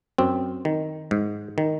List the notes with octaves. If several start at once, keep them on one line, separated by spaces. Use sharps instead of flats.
F#2 C4
D#3
G#2
D#3